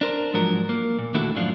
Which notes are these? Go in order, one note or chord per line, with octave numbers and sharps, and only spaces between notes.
D4 A#4 C5
G#2 F3 F#3 A#4
A#3
A#2
D#2 A3 D4 E4 F#4 A4
F#2 A2 F3 D4 F4